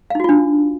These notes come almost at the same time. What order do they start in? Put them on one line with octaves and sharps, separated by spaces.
F5 D#4 F#4 F4 D4